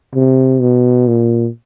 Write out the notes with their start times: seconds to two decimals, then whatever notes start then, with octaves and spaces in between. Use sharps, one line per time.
0.15 C3
0.61 B2
1.07 A#2